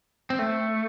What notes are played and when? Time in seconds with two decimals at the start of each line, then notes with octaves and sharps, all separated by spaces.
0.30 C4
0.39 A3